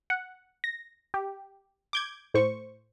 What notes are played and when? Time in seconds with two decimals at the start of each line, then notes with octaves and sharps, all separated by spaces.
0.10 F#5
0.64 A#6
1.14 G4
1.93 D6 G6 G#6
2.34 A2 C5 C#6